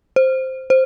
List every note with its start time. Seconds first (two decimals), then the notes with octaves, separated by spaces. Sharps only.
0.16 C5
0.70 C5